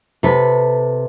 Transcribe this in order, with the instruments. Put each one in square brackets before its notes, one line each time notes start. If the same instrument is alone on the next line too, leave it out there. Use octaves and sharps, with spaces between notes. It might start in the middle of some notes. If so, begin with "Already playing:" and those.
[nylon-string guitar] C3 A4 B4